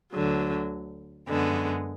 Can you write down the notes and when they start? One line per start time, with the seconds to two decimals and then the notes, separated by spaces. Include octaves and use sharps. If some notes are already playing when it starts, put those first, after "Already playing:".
0.13 D2 D3 F#3
1.27 F#2 D3 G#3 B3